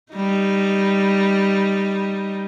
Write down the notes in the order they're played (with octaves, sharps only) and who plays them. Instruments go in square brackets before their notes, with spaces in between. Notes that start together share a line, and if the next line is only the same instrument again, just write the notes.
[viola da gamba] G3 D#4